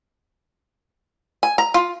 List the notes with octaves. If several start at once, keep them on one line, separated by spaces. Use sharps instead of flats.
G#5
A#5
F4